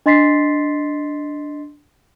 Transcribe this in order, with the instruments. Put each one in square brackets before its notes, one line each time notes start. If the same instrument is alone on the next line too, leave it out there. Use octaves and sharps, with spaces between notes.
[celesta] D4 D#5 C6 A6 B6 C7